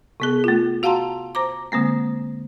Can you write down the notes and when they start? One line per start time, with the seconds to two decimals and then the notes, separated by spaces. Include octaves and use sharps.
0.20 C3 B3 G#4
0.44 A3 F4
0.83 F#4 F5 F#5 A5 A#5 C6
1.35 C5 A#5 D6
1.72 D3 G#3 A#3 C4